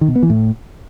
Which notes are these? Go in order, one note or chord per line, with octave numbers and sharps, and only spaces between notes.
D#3
B2
B3
E3
A2